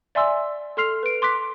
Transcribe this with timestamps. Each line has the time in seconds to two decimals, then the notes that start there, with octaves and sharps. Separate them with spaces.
0.15 D5 E5 G#5 C6 E6
0.77 A4 C6 F6 C7 F7
1.03 B4 D7
1.22 C6 D6 F#6 B6